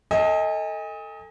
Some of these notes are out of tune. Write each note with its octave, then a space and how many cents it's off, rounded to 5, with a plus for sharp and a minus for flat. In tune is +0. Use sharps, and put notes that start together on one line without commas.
A4 +15 D#5 +25 G#5 -35